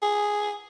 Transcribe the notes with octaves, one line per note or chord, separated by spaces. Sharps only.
G#4